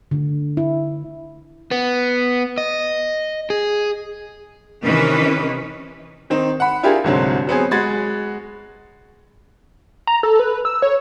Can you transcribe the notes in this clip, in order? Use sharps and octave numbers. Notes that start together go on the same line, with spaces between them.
D3
E4
B3
D#5
G#4
C3 D#3 E3 C#4 B4
D#3 C4 D#4
F#5 B5
D4 E4 F4 G4 G#4 A#4
C2 G#2 D3 F#3 C4
F#3 B3 C4 G#4
G#3 F#4 B5 G#6 A6
A#5
A4
B4
E6
C#5